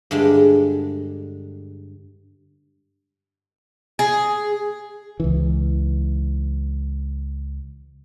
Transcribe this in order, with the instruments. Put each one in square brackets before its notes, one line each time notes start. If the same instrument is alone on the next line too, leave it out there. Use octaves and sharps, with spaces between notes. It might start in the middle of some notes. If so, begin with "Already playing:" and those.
[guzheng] G2 D3 G#3 D4
[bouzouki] G#4
[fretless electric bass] C#2 E3